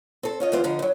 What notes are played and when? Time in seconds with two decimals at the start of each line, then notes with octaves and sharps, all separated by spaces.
0.23 C4 A4
0.40 C#4 F4 D#5
0.52 G2 E3 B3 F4 C5 F5
0.64 D3 F3 D#4
0.79 G2 F#3